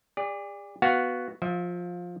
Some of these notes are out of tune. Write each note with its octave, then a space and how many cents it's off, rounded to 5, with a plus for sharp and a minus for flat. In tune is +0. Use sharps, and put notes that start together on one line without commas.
G#4 -45 D5 +0
B3 +0 F#4 +0 F5 +5
F3 +15 E5 -25